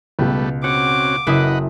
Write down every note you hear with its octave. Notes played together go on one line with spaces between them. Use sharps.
C#2 B2 G3 A3 B3
C4 C#4 F#4 F#5 D6
F#1 E4 B4 D#5 F#5 D#6